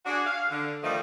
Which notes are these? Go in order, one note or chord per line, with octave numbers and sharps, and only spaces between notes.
D4 F#4 G#4
F5
D3
D#3 F3 G3 A3 D4 D#4